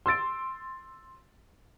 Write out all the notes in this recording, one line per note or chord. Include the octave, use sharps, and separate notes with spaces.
C6 E6 A6 D7